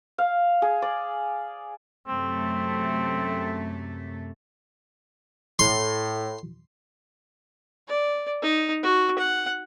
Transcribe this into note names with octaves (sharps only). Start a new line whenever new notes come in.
F5
G#4
D5
F#2 C3 A3 C4
A2 C6
D5
D#4
F#4
F#5